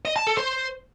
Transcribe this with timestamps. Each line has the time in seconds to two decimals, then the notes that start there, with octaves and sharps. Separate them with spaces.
0.05 D#5
0.16 A5
0.27 A4
0.37 C5